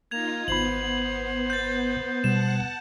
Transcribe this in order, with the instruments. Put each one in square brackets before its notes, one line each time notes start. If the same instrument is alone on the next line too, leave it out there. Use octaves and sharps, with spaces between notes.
[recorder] A#3 [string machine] D#4 F4 [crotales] G#6 F7
[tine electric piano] G#1 B5 [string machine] B3 [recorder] C5 [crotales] F#7
[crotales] G6 A6
[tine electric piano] B2 G3 [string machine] F#5 A5 [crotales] E7